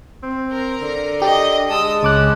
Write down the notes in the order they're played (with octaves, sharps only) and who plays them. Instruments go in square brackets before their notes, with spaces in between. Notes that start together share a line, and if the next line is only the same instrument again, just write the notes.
[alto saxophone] C4
[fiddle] A#4
[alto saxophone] D3
[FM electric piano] G4 [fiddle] D#5
[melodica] G#3 A5 [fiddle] D#6 E6
[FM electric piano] C#2 D6 F#6 [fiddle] C#4